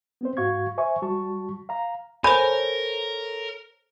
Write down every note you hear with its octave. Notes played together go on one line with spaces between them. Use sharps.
B3 C4 C5
G#2 F#4 F5 C#6 G#6
C5 E5 G#5 C#6
G3 F#4 A5 C#6
F5 A#5
A4 A#4 C5 C#5 G#5 B5 G6